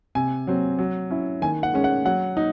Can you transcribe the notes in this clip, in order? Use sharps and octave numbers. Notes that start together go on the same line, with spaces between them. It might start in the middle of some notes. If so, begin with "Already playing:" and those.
C3 G#5
F#3 C4
F#3
C#4 E4
D#3 G#5
F#5
G#3 C#4
F#5
F#3 F#5
D#4